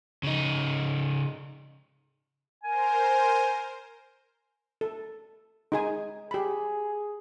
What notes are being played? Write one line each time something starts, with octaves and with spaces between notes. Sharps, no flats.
C#3 D#4
A#4 C5 G#5
A4
D#4 G#4 G#5
G4 G#4 B5